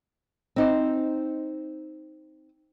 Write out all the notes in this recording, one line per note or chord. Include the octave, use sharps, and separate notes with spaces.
C4 D#4 C5